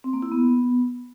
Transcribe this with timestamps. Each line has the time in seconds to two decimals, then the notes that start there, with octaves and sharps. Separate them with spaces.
0.04 C4
0.13 A#3
0.22 E4
0.32 B3